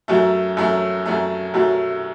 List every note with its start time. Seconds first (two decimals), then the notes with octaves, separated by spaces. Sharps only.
0.08 F#2 F#3 A3
0.57 F#2 F#3 A3
1.06 F#2 F#3 A3
1.54 F#2 F#3 A3